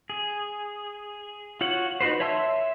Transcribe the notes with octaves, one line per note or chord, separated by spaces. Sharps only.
G#4
F4 F#4 C#5 F#5
D#4 F#4 B4 C5
C#5 E5 A5 C6 E6